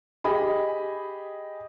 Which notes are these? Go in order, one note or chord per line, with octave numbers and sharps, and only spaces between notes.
G4 G#4 D#5 B5